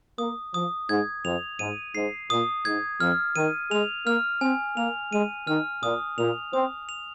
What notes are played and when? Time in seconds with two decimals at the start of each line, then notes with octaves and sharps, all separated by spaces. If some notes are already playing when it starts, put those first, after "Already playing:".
0.18 A#3 D#6
0.54 F3 D#6
0.89 G#2 G#6
1.24 F2 F7
1.59 G#2 D#7
1.95 G#2 C7
2.30 A#2 D#6
2.65 G#2 G#6
3.00 F2 F6
3.36 D#3 D#7
3.71 G#3 F7
4.06 A#3 F6
4.41 C4 G#5
4.77 A#3 F7
5.12 G#3 D#7
5.47 D#3 F6
5.83 A#2 D#6
6.18 A#2 F7
6.53 C4 D#6
6.89 F7